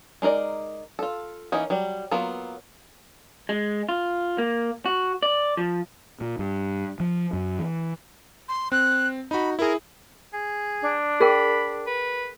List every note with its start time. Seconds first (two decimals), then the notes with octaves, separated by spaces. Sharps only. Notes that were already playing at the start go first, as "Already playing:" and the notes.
0.22 G#3 D#4 A#4 D5
0.99 F4 A4
1.52 E3 A#3 C#4 D#4
1.70 F#3 G3
2.11 F#3 A#3 B3 F4
3.49 G#3
3.89 F4
4.38 A#3
4.86 F#4
5.23 D5
5.57 F3
6.21 A#2
6.39 G2
7.00 F3
7.33 F#2
7.59 E3
8.49 C6
8.72 C4 F#6
9.31 D#4 F#4 B5
9.59 E4 G#4 A#4
10.33 G#4
10.82 D4
11.20 G#4 A#4 G5 B5
11.86 B4